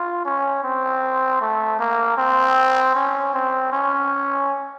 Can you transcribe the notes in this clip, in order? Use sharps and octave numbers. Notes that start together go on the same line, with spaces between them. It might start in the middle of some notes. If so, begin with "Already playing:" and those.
Already playing: F4
C#4
C4
A3
A#3
C4
C#4
C4
C#4